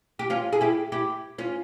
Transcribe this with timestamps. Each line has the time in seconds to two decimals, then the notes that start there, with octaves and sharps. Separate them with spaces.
0.19 G4
0.30 C#4 F4
0.53 G#4
0.61 E4 G4
0.92 E4 G4
1.38 C#4 F4